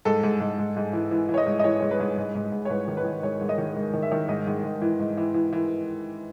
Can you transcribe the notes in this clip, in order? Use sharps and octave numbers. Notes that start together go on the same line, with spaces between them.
G#2 A4
G#2
G#2
G#2
G#2
E3
E3
E3 C#5
D#5
G#2
D#5
E3 C#5
G#2 C#5
B4
G#2
G#2
G#2
G#2
C#5
G#2 B4
D#3
B4
D#3
G#2 C#5
G#2
D#5
D#3
G#2
D#3
E5
D#3
G#2 D#5
G#2
G#2
E3
G#2
E3
E3
E3